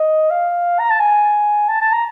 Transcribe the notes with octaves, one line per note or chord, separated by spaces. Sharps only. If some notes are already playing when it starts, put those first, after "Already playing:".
Already playing: D#5
F5
A#5
A5
G#5
A5
A5
A#5